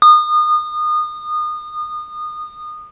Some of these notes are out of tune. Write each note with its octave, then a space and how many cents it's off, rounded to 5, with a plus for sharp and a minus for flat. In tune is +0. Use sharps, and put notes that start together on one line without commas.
D#6 -30